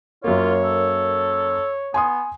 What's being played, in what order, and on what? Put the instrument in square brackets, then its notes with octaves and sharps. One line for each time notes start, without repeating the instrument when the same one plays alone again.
[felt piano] F#2 A#3 [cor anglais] F4 [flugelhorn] C#5
[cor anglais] A4
[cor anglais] B3 [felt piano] G#5 C6 D#6